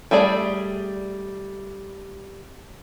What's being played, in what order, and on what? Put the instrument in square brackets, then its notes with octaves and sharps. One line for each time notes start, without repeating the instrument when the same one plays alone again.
[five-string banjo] G3 A3 G#4 D5